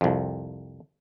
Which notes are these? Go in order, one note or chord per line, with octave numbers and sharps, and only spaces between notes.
C2 F2